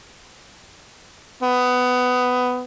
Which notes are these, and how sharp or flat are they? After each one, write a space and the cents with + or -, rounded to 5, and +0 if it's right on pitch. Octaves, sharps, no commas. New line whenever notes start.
B3 +15